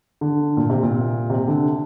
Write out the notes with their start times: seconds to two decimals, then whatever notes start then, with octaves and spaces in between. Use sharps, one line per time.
0.21 D3
0.57 A#2
0.70 C3
0.83 A#2
1.30 C3
1.48 D3